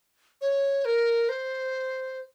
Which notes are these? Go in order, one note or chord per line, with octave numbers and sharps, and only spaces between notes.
C#5
A#4
C5